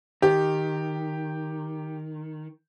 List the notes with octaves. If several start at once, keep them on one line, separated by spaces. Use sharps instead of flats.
D#3 G4